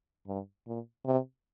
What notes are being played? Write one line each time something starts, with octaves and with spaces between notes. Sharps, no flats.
G2
A#2
C3